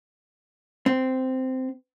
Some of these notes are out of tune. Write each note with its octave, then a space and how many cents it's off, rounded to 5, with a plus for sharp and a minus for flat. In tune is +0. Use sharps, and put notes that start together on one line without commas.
C4 -10